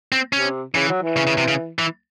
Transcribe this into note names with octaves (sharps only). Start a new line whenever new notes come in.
C4
C3 C#4
C#3 E3
F#3
E3
C#3
C#3
C3
C#3
E3